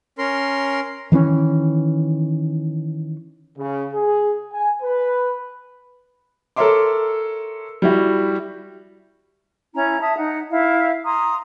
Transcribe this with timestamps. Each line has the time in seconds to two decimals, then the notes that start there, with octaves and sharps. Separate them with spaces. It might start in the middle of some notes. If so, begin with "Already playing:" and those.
0.18 C#4 A#4 C6
1.12 D#3 E3 A#3 C#4
3.57 C#3
3.94 G#4
4.52 G#5
4.82 B4
6.56 A4 A#4 C#5 E5 C6 D6
7.82 G3 E4 F#4
9.75 C#4 E4 A#5
10.00 E5 A5 D#6
10.17 D#4 F#5
10.50 E4 E5 F5
11.05 A#5 C6 D#6